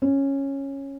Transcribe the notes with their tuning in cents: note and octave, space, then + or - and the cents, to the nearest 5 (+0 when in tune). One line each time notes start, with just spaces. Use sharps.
C#4 -10